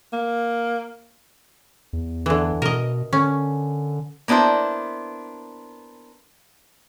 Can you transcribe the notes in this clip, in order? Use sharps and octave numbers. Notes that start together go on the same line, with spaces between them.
A#3
E2
D3 E3
B2 A#4 D#5
D3 C#4
A#3 B3 D4 E4 C5